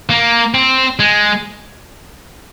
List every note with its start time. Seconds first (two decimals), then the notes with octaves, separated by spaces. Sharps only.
0.10 A#3
0.54 C4
0.99 G#3